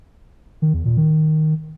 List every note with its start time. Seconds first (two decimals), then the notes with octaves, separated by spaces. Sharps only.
0.62 D#3
0.74 E2
0.86 A#2
0.97 D#3